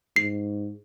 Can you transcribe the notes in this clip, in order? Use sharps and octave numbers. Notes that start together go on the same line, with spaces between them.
G#2 C7